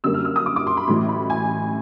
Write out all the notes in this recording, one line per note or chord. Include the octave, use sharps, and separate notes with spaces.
F#2 D3 G3 A#3 E6
F6
E6
D#6
D6
D6
C6
B5
A1 A2 F#3 A3 C6
B5
G#5